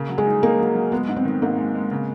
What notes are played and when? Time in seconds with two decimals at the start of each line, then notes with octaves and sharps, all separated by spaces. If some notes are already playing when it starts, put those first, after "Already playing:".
Already playing: C#3 A#3
0.09 F#3
0.18 G#3
0.26 D#4
0.43 A#3 D#4
0.59 F#3
0.75 F#3
0.92 G#3 B3
1.08 G#2
1.16 C4
1.25 D#3
1.42 G#2 A#3
1.58 G#3
1.75 G#3
1.91 C#3